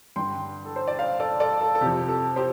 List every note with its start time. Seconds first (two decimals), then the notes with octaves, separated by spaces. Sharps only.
0.16 G2 D3 G5 C6
0.65 A4
0.76 C5
0.87 D5
0.99 C5 F5
1.20 A4 D5
1.40 A4 D5
1.61 A4
1.75 A4
1.81 C3 G4
1.86 F2
2.09 A4
2.36 G4 C5